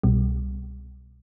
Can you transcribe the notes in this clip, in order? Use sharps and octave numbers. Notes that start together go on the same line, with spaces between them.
C2 B2 G3